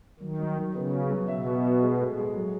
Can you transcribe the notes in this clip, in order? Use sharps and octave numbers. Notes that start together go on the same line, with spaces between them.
D#3 F#3
F#3
F#3
C#3 B3
F#4
F#3
B2 E5
F#4
F#4
G#3
A2
G#3
F#3